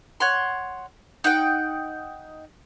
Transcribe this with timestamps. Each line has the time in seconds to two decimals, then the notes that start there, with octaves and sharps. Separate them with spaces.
0.20 C#5 F#5 C6
1.24 D#4 F#5 G5